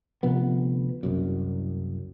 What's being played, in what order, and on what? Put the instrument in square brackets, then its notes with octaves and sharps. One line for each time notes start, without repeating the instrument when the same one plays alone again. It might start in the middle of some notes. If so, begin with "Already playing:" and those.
[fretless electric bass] D2 C3 F3 B3
F#1 C2 F#2